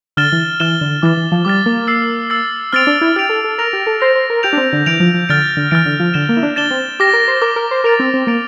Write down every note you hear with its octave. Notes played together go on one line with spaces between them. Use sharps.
D3 F6 A6 E7 G7
E3
E3 F6 A6 E7 G7
D3
E3 D6 F6 A6
E3
F3
G3 D6 F6 A6
A#3
E6 A6 C7
E6 A6 C7
C4 F6 A6 D7 F7
D4
E4
G4 F6 A6 D7 F7
A4
A4
A#4 F6 A#6 F7
G4
A4
C5 F6 A#6 F7
C5
A#4
G4 G6 D7 F7
D4
C4
D3
E3 G6 D7 F7
F3
F3
D3 F6 A6 D7
D3
E3 F6 A6 D7
D3
F3
D3 A6 E7 G7
A#3
E4
D4
D4 A6 E7 G7
C4
G4 D6 F6 A#6
A#4
C5
A#4 D6 F6 A#6
A#4
C5
A#4 A6 D7 F7
C4
C4
A#3 A6 D7 F7